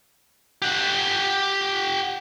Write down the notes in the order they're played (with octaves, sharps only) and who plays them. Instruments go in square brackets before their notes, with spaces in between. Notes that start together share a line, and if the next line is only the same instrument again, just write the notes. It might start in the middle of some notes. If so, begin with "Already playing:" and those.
[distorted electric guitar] G4 F#5